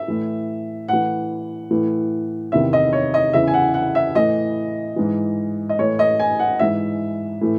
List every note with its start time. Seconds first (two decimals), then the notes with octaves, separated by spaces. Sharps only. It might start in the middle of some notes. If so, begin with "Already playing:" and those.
Already playing: E5
0.08 A2 E3
0.88 A2 E3 F#5
1.71 A2 E3
2.52 E2 C3 D#3 E5
2.73 D#5
2.93 C#5
3.14 D#5
3.33 E2 C#3 E3 E5
3.47 G#5
3.54 F#5
3.74 F#5
3.95 E5
4.15 A2 E3 D#5
4.96 G#2 E3
5.69 D#5
5.79 A2 E3 C#5
5.99 D#5
6.20 G#5
6.40 F#5
6.59 G#2 E3 E5
7.41 A2 E3